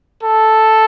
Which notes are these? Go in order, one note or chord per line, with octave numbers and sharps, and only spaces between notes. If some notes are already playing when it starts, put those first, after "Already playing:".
A4